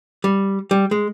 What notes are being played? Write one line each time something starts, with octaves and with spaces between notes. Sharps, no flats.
G3
G3
G#3